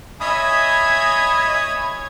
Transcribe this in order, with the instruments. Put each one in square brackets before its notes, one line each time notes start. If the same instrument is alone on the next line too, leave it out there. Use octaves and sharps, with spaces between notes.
[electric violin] C#5 G#6 [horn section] D#5 E5 G#5 [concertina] B5 D#6